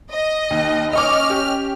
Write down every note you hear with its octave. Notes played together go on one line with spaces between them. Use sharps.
D#5
D#2
C#4 D#5 C#6 D6 F6
G4